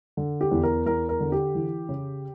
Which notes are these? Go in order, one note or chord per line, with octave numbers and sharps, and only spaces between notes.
D3
G4
E2
A#4
E2 A#4
A#4
D3
G4
E3
C#3